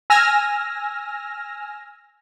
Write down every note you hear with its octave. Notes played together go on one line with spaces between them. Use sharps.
G#5 E6 F6 A#6